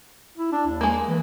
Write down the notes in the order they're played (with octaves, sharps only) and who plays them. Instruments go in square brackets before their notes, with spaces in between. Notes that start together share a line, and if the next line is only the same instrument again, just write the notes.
[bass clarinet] E4
D4
D#2
[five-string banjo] G#3 A#3
[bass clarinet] E3